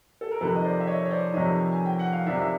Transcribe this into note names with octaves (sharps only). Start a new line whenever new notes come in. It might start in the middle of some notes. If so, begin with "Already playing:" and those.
A4
A#4
F2 C3 D#3 A4 B4
D#5
C5 D5
E5
C#5 D#5
C#5
C5 D5
F2 C3 D#3 C#5 D#5
G#5
G5
F#5
F5
F2 C3 D#3 D5 E5
E5